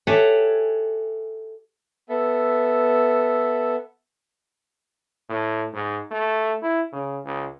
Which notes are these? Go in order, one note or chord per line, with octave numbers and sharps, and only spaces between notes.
G4 A4 C#5 E5 F#5 G#5
B3 A4 E5
A2
G#2
A3
E4
C#3
C#2